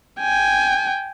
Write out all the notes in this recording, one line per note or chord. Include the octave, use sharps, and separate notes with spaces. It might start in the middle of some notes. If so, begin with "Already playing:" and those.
G5 G#5